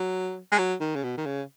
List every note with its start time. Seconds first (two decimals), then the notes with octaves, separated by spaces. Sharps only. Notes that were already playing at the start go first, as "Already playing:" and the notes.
Already playing: F#3
0.52 G#3
0.58 F#3
0.80 D#3
0.95 C#3
1.04 B2
1.18 D#3
1.26 C#3